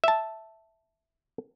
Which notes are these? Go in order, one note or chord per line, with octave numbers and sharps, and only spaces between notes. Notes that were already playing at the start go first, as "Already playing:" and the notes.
E5 A5